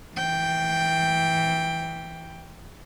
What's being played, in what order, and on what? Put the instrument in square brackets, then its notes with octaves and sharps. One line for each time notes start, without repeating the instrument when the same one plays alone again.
[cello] E3 G5